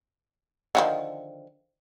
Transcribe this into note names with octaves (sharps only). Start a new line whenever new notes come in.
D3 D#3 F3